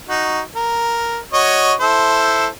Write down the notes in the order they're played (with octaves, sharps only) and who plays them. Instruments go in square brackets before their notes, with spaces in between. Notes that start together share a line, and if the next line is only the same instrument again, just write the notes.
[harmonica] D#4 F#4
A#4
F#4 C#5 D#5
E4 A4 C5